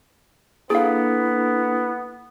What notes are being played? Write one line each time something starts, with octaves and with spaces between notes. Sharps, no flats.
A#3 B3 D4 E4 G#4 A4 F5